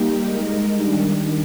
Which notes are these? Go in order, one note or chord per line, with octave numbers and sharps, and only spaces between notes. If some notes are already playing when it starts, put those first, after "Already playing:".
Already playing: G3 A#3 D#4 G4
G#3 D#4 A#4
D#3 G3 D4